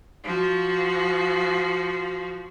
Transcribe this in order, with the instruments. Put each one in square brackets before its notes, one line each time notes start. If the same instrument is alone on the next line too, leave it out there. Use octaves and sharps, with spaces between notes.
[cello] F3 F#4